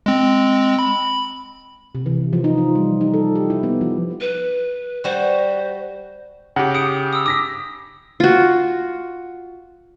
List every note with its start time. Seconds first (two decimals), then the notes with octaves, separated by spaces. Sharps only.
0.06 G#3 C4
0.79 B5
1.95 C3
2.06 E3
2.33 F3
2.44 D#4
2.58 F4
2.75 G3
3.01 D#4
3.14 A4
3.35 G4
3.50 E4
3.63 B3
3.81 F3
4.21 B4
5.04 G3 F#4 C5
6.56 C#3 G4 F#5
6.75 D#6 C#7 D7
7.13 D#6 E6
7.26 D6 D#6 A#6 B6
8.20 F4 F#4